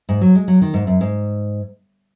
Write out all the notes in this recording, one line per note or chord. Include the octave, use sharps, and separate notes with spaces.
G#2
F#3
G#3
F#3
D#3
G#2
F#2
G#2